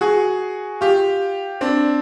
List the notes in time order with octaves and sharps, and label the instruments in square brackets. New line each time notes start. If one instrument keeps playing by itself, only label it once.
[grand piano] F#4 G#4
F4 G4
C4 D4